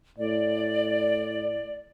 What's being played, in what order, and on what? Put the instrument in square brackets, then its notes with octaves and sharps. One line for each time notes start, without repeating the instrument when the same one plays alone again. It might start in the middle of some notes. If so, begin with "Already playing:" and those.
[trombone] A2 [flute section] D5